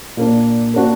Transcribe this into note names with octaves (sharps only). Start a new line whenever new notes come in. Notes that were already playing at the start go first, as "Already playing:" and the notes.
A#2 A#3 D4
A#3 D4 F#4